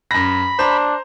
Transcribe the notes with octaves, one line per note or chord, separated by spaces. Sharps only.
F#2 B5 A#6
D4 C5 A#5